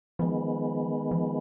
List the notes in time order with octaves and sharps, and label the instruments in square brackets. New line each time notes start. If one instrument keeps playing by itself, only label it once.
[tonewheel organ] D#3 G#3 B3 [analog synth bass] F3
[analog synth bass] F3